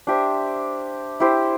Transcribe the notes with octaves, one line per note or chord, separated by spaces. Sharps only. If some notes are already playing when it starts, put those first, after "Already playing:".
D4 G4 C5 E5
E4 G4 C5